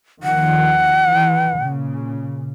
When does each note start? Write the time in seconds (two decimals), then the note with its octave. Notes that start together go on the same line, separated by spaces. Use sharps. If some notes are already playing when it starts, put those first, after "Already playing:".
0.23 D#2 D#3 F3 F#5
1.09 E3
1.58 A#2 C#3